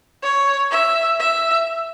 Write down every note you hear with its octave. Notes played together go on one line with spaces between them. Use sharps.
C#5
E5
E5